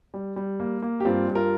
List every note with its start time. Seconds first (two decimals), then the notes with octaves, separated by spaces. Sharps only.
0.14 G3
0.36 G3
0.60 A#3
0.82 A#3
1.00 G4
1.05 G2 C4 F4
1.28 G2
1.35 F4 A#4